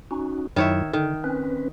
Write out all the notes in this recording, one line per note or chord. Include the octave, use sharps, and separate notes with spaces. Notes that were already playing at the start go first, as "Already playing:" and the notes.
C#4 D#4 F#4
F#2 D#3 F#3 E4 C#5 E5
D3 D#3
C4 C#4 B4